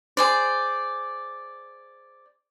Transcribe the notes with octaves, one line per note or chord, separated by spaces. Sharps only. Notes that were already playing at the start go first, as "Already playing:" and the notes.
G#4 C5 D5